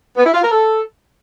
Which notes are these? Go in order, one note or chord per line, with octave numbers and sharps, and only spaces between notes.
B3
E4
F4
A#4
A4